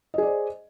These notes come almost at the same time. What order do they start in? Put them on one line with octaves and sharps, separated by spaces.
D#5 G#4 D5 C5